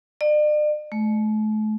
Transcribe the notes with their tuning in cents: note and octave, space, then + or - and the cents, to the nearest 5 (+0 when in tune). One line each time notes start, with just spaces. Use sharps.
D5 +40
A3 -40